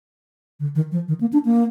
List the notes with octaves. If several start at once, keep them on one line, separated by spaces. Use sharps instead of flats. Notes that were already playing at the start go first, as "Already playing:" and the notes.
D3
D#3
F3
D#3
A#3
D4
A#3